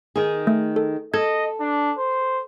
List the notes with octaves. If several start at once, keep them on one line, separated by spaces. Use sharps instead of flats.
D#3 G#4
A3
A4
A4 D#5 G#6
D4
C5